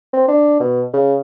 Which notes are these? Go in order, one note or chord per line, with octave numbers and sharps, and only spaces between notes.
C4
D4
B2
C#3